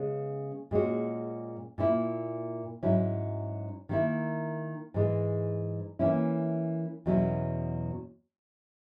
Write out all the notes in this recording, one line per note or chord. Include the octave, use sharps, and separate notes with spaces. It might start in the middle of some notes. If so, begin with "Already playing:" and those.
Already playing: C#3 G#3 B3
A#2 G#3 C#4 F#4
A#2 A#3 E4
G#2 F#3 C#4 E4
D#3 A#3 E4
G#2 E3 G#3
E3 A#3 C#4 E4
E2 B2 F#3 C#4 E4